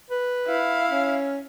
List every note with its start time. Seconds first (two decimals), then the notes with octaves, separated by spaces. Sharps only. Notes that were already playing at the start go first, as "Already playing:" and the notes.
0.11 B4
0.47 E4 F5
0.90 C#4